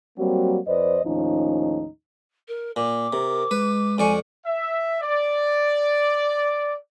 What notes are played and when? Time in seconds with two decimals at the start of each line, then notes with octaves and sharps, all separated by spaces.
0.18 F#3 G3 A#3 C4 F#4
0.67 F2 B4 C5 D5 D#5
1.05 D#2 A2 F3 C#4 D#4
2.48 A#4
2.76 A#2 D6
3.13 C3 A#4
3.51 G#3 B4
3.98 F2 D5 G#5 C#6
4.46 E5
5.02 D5